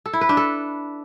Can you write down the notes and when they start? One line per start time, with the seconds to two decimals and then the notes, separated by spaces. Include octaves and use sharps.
0.06 A4
0.13 E4
0.21 B4
0.29 D4
0.37 A4